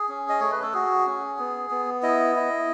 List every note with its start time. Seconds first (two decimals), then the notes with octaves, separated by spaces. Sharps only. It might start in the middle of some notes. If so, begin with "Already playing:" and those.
Already playing: G#4
0.08 C#4
0.29 D#5
0.40 A3 C#5
0.52 B4
0.62 A4
0.74 F#4 G#4
1.06 C#4
1.39 B3
1.71 B3
2.03 E4 D#5
2.36 E4